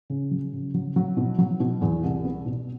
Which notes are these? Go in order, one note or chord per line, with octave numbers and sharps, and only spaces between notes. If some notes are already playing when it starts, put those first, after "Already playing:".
C#3
F#3
C#3
F#3
F#3
B2
F#3
B2
E2
C2
B3
B2